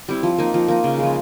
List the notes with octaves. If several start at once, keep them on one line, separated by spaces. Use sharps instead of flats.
G3 C4 E4
F3
A#3 D#4
F3
A#3 D#4
C#3
F3 G#3